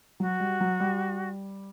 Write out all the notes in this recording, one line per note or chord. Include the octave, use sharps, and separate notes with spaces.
F#3 F#4
G3
F#3
G3